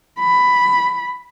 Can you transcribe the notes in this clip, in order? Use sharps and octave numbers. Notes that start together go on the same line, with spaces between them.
B5